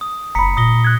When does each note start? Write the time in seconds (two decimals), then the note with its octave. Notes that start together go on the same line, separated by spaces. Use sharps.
0.01 D#6
0.35 F#1 A#5 B5 B6 C#7
0.57 A#2 D#6 A#6 G7
0.85 F#6 G#6